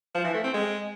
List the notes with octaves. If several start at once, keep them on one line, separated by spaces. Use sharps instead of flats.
F3
E3
A3
C4
G#3